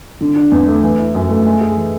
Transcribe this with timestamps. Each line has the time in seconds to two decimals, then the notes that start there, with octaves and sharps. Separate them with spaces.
0.21 D3
0.36 D4
0.52 E2
0.67 A3
0.83 E3
0.99 E4
1.15 F#2
1.29 A3
1.46 G#3
1.61 G#4
1.77 E3